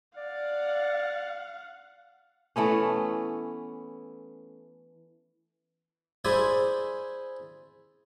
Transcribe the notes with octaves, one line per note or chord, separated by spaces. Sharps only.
D5 F5 F#5
E3 A3 B3 C#4
E4 G#4 C5 D5 E5 G#5